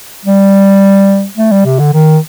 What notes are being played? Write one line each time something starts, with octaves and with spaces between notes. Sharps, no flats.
G3
A3
G3
C3
D3
D#3